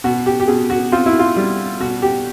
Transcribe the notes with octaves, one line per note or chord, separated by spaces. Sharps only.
B2 F#4
G4
G4
B2 G#4
F#4
C4 F4
E4
F4
G3
B2 F#4
G4